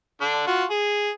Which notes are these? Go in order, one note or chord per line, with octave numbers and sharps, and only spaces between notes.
D3 D4
F4 F#4
G#4